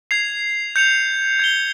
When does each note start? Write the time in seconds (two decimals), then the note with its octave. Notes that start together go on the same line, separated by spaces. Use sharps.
0.11 G#6 C7 F7
0.76 G6 C#7 F7
1.39 G#6 C#7 G7